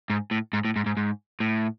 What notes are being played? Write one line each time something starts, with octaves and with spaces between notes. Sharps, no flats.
G#2
A2
G#2
A2
G#2
G#2
G#2
A2